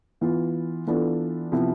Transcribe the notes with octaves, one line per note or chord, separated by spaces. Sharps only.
E3 B3 F4
E3 B3 D4 F4 A4
C3 F3 B3 E4